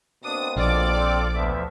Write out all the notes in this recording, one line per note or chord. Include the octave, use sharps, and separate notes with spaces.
B2 A#3 C4 D4 D#6
A#1 F4 A4 D5 F5 D6
C4
D2 F3 B3 E5